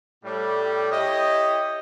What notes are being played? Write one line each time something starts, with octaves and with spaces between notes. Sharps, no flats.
A2 G3
E4 G4 C#5 D#5